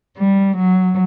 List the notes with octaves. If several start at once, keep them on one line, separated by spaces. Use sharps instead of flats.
G3
F#3